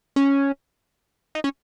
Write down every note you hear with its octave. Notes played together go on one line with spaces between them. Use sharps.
C#4
D#4
C#4